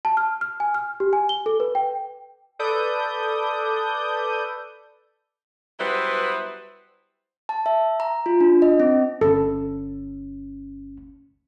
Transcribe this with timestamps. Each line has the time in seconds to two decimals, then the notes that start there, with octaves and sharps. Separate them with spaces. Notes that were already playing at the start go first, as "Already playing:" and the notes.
0.05 A5
0.17 F6
0.41 F6
0.60 G#5
0.75 F6
1.00 G4
1.13 G#5
1.29 G7
1.46 A4
1.60 B4
1.75 G5
2.59 A4 B4 D5 D#6 G6
5.80 F#3 G3 B3 E4 B4 C5
7.49 A5
7.66 E5
8.00 A#5
8.26 F4
8.41 D4
8.62 D#5
8.80 C4
9.21 G1 C#4 A4